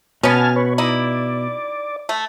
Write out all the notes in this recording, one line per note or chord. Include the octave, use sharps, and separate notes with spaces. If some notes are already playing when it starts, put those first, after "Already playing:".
B2 B3 C#4 G#5 A5 F6
B4 C#5
D#4 E4 D5
A3